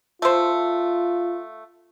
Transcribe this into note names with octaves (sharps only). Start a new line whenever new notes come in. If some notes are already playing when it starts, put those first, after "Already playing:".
A3 F4 C5